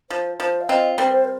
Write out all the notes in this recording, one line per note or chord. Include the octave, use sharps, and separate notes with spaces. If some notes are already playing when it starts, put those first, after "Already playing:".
F3 C5
F3 C5
F5
C4 F4 D#5
G3 C4 A#4
C5
A#4